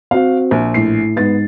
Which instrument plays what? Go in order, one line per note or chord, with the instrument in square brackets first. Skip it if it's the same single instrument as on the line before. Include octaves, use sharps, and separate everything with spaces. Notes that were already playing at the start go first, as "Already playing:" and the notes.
[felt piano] C4 F#4 [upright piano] F5
[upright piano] A#1
[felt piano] A2 C7
[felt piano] G#2 A6 [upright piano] B3